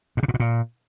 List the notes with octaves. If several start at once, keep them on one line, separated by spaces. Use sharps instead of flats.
A#2
C#3
A#2
B2
A#2